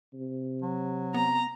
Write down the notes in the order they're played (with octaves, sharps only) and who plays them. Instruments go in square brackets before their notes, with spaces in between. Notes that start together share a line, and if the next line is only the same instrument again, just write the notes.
[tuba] C3
[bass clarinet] F#3
[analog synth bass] B3 [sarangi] A#5